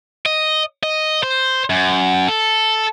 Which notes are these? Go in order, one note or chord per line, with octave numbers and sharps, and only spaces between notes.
D#5
D#5
C5
F#2
A4